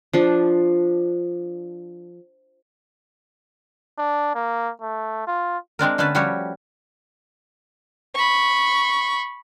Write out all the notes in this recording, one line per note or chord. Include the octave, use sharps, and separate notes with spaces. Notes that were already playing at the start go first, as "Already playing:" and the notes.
F3 D4
D4
A#3
A3
F4
G#3 C4 D4 A#4
D3 A3 C#4 B4 A5
F3 G3 C#4 F#4 G4 C#5
B5 C#6